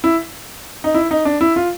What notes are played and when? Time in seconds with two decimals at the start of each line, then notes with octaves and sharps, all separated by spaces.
0.04 E4
0.84 D#4
0.94 E4
1.11 D#4
1.25 D4
1.41 E4
1.56 F4